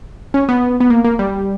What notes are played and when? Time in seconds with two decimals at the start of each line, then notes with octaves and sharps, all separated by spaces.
0.34 C#4
0.49 B3
0.80 B3
0.90 A#3
1.04 A#3
1.19 G3